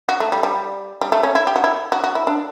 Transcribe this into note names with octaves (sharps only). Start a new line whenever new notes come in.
F#4
A3
G3
G3
G3
A3
C#4
E4
G4
F#4
E4
F#4
F#4
E4
D4